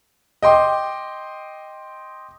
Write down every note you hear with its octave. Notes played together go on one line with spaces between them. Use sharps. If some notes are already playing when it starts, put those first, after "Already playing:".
D#5 G5 C6 D6